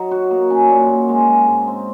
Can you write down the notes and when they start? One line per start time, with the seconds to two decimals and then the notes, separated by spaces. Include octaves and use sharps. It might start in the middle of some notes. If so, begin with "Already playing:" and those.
Already playing: F#3 D#4
0.11 F#4
0.31 A#3
0.50 C#4
0.70 A#2
0.89 A#2
1.09 G#3
1.28 G#3
1.47 G#2
1.67 C4